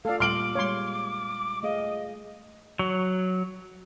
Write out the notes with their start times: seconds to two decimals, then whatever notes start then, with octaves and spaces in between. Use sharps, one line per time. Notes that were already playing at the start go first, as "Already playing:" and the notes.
0.05 A3 F4 A4 D5 F5
0.20 A#2 G3 C6 D6 F6 D7 F#7
0.55 G3 G#3 C#5 F5 C6
1.63 A3 G#4 D#5 F5
2.79 F#3